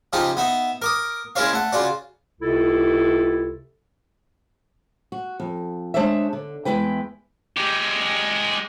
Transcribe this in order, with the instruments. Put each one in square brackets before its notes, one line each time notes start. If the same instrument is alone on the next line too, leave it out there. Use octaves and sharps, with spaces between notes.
[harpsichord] C#3 F3 D#4 F4 G4
B3 D#4 E5
A#4 D6 D#6
G#3 C#4 E4 A#4 C#5 F5
A3 F#5
C#3 F4 F#4 D5
[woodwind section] C#2 C3 E4 A4
[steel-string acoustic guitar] F#4
F2
G#3 D4 G#4 C5 C#5 E5
D3
E2 G#2 G#3 E4 B4 G5
[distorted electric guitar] G#3 G4